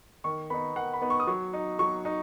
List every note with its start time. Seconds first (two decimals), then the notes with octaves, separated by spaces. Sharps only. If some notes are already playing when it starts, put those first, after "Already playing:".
0.24 D#3 C#6
0.50 B3 D#4 B5
0.76 D#3 F#5
0.93 B5
1.02 B3 D#4
1.10 C#6
1.20 D#6
1.27 F#3 C#6
1.53 D#4
1.79 F#3 C#6
2.05 D#4